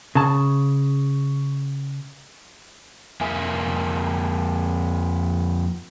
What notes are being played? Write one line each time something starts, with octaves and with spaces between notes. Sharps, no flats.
C#3 A5
F2 A#3 E5 G#5